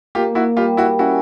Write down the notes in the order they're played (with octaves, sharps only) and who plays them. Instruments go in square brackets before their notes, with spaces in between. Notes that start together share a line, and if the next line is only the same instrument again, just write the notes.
[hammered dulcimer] A#3 [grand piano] F4 G4
[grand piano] E4 F#4
[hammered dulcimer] G3 [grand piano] F4 G4
[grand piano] E4 F#4
[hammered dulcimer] C#4 [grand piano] E4 F#4